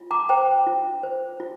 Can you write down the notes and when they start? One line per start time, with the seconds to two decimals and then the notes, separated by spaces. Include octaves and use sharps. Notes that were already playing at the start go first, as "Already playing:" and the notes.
Already playing: F4
0.11 A#5 D6
0.29 C5 G5 A#5
0.67 F4
1.03 C5
1.40 F4